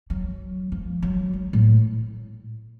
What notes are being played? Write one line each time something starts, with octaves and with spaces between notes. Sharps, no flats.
F#3
F3
F#3
F#3
A2